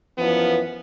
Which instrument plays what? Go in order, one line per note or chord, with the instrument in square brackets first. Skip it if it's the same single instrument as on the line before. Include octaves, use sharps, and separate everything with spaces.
[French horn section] F#2 E3 F3 B3